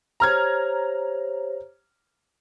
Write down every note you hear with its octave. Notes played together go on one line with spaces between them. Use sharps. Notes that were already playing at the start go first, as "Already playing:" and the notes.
G4 C5 C#5 A#5 F6 G#6